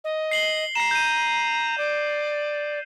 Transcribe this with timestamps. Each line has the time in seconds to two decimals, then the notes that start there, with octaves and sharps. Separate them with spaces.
0.04 D#5
0.31 C7 F#7 G7
0.75 A#5 C7 E7
0.91 G6 D#7
1.78 D5